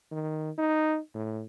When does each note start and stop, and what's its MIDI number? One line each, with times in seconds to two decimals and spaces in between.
0.11 0.50 51
0.58 0.98 63
1.14 1.44 45